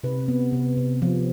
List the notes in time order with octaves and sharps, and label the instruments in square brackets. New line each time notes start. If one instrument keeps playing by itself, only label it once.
[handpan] C3 B4
B3
C3
C3
F3